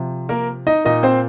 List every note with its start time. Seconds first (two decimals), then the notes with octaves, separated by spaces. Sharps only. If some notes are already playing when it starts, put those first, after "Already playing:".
Already playing: C3 F3
0.29 A#3 A#4
0.67 D#4 D#5
0.84 A#2 A#3 D#4 D#5
1.03 C4 C5